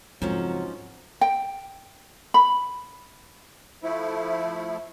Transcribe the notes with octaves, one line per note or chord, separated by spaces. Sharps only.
F2 G#2 C#3 F3 F#3 C#4
G5
B5
F3 A3 E4